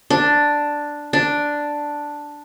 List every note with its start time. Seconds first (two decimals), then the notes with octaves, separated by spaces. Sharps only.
0.10 D4
1.13 D4